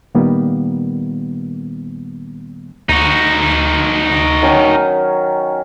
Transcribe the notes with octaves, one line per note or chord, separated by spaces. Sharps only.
A#2 D#3 G3 A#3 B3
D2 D#4 F#4
D#3 F#3 C#4